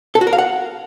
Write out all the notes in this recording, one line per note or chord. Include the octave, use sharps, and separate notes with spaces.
A4
F#4
A#4
F5
F#5